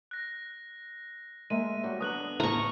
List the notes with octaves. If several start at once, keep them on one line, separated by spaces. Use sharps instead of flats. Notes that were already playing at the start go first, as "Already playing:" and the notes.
F#6 A#6
G#3 A#3 E5 D#7
F#3 G3 F#4
D3 B3 A#5 D#6 F#6 F#7
A2 A#5 C#6 F6